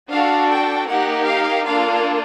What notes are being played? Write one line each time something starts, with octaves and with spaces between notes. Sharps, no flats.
D4 F#4 A4 F5
G5
A#3 D#4 G4 F#5
F5
A#3 D4 F4 A4 F5